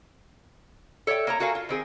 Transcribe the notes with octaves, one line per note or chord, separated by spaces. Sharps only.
A4 C#5 D5 E5 G5
A#3 C#5 A#5
A#3 F#4 A4 A#4 F5 G#5
F4
D#3 C4 G#4